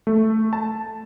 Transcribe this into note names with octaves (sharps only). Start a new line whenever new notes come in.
A3
A5